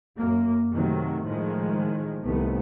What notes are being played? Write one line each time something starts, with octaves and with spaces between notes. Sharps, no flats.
F#2 A#3
C3 D#3 F#3 A3
A2 D#3 F3 G#3
C2 D#3 A3 B3